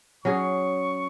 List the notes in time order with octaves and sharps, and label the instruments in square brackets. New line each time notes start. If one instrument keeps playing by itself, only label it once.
[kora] F#3 C#4 G#4 [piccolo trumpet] C#6